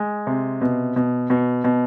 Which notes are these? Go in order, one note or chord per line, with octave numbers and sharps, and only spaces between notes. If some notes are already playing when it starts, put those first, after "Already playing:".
Already playing: G#3
C3
B2
B2
B2
B2